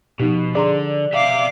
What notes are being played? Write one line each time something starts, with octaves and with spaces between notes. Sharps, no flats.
B2 F3 D#4 G4
D3 G#4 D5 A#5 C6
G4 E5 F5 D6